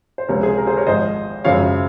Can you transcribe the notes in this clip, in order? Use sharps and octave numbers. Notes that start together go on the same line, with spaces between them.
C5
C#2 C3 F3 A#4 C#5
G#4 C5
A#4
G#4 C5
A#4 C#5
G#1 G#2 F3 C5 D#5
G#1 F#2 C#3 F3 C#5 F5